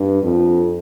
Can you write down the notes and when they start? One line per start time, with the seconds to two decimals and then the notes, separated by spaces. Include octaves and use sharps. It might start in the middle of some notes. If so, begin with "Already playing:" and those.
Already playing: G2
0.23 F2